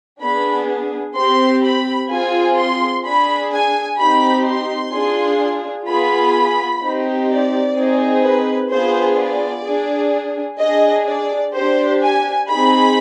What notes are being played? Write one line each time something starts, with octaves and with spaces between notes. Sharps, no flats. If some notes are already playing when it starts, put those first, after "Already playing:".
B3 D4 G#4 B5
C4 G4 C6
B5
C4 F4 G#4 G#5
C6
D4 G#4 B5
G#5
C4 D#4 G4 B5
C6
D4 F4 G#4
B3 F4 G#4 B5
C4 D#4 G4
D5
C4 D#4 G#4
B4
B3 D4 F4 G#4 C5
D5
D4 G#4
D4 G#4 D#5
D5
D4 G4 C5
G#5
C4 D#4 G#4 B5